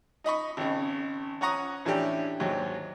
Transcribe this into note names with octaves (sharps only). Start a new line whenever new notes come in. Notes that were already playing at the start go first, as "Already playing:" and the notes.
D#4 D#5 B5 C#6
G#1 C#3
C#4 C#5 F#5 A#5 C#6 D#6
A2 E3 C#4 D4 G4
D#2 G#2 F#3